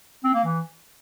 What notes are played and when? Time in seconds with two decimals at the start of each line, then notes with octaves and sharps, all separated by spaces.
0.24 C4
0.34 A#3
0.44 E3